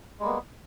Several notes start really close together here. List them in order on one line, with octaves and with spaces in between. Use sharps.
G#3 G3 A#3 B3